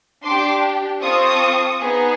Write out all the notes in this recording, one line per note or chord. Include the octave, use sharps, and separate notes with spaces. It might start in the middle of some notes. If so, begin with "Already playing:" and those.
D4 G4 C6 D6
C4 F4 A4 C#6 D#6
B3 D#4 G#4